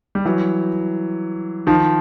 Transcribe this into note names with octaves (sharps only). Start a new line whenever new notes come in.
G3
E3 F#3
D#3 F3